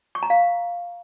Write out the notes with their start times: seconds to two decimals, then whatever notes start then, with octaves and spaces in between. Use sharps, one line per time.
0.15 C#6
0.23 A#5
0.30 F5